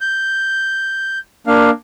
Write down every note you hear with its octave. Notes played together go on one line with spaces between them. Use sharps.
G6
A#3 D4 F5